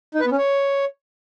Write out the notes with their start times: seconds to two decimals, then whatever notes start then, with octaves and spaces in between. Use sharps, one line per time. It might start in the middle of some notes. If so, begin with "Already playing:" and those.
0.14 D#4
0.20 B4
0.26 B3
0.32 C#4
0.38 C#5